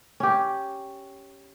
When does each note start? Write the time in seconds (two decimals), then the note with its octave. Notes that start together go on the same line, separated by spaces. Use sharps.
0.20 C#4 G4